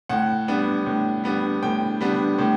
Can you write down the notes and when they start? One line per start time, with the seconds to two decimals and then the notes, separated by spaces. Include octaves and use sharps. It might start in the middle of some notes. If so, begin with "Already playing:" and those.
0.09 A2 F#5
0.48 G3 B3 D4
0.86 A2
1.24 G3 B3 D4
1.62 A2 G5
2.01 G3 B3 D4
2.38 A2